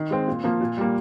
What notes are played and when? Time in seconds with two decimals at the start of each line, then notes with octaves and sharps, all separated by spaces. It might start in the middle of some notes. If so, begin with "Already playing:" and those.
Already playing: D#3
0.11 G#3 C4
0.27 A#2
0.44 F3 A#3
0.61 A#2
0.77 G3 A#3